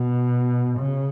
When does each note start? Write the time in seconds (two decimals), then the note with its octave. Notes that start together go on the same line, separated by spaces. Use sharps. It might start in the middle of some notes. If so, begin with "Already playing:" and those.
Already playing: B2
0.78 C#3